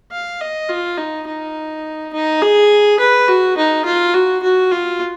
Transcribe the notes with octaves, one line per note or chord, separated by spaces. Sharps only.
F5
D#5
F4
D#4
D#4
D#4
G#4
B4
F#4
D#4
F4
F#4
F#4
F4